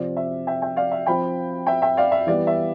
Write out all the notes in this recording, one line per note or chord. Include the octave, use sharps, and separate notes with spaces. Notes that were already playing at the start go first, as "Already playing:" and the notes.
Already playing: C3 F3 C4 F4 D5
E5
E5 G5
E5 G5
D5 F5
E5
F3 C4 F4 G5 B5
E5 G5
E5 G5
D5 F5
E5
E3 G3 B3 D5
E5